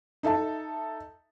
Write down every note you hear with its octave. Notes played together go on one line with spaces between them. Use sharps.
D#4 A4 E5 A5